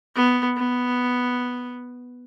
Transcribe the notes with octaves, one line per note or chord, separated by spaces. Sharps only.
B3
B3